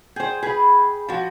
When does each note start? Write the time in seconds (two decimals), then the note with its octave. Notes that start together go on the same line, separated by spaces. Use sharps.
0.16 G#4 C5 G5
0.43 G#4 B4 B5
1.09 F3 F#4